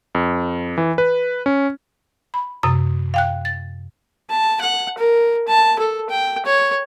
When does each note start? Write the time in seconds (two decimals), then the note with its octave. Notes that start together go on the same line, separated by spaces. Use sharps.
0.15 F2
0.78 E3
0.98 B4
1.46 C#4
2.34 B5
2.63 F#2 C3 D#6
3.14 F5 G5 F#6
3.45 A6
4.30 A5
4.60 F#5
4.98 A#4
5.48 A5
5.79 A4
6.10 G5
6.45 C#5